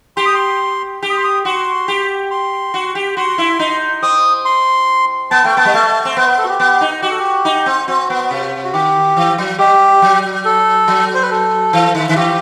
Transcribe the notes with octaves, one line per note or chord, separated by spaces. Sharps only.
G4 C6
D#6
C6
G4
D#6
C6
D#6
F#4 C6
G4
C6
F#4
G4
F#4 C6
E4
D#4
C4 D#6
C6
B3 A5
A3 G5
B3 A5
G3
A3
C4
B3 C5
B4
A4
F#4
G4
B3
D#4
F#4 G4
A4
G4
D#4
C4
C4 F#4
B3
C3
F#4
D#3 G4
E3
F#3
G3 G4
F#3
A4
F#3
C5
B4
A4
E3
D#3
D#3
E3 G4